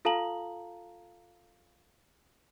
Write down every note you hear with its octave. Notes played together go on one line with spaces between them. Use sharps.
F4 A4 F5 A5 A#5 F#7